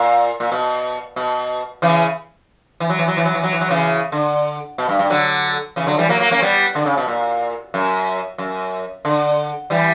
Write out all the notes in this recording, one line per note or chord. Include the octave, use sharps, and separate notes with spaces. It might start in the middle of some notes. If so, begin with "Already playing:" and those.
Already playing: A#2
A#2
B2
B2
C#3 E3
E3
F#3
E3
F#3
E3
F#3
E3
F#3
E3
F#3
C#3 E3
D3
B2
G2
G2
D3 F#3
C#3 E3
D3 F#3
E3 G3
F#3 A#3
F#3 A#3
A#3 C#4
G3 B3
D3
C#3
B2
A#2
F#2
F#2
D3
E3 G3